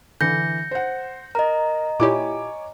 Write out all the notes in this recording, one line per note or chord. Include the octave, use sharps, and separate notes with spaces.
D3 E3 G6 A#6 C#7
C5 F#5
A#4 D#5 A#5
A#2 E4 G4 C#5 G#5 D6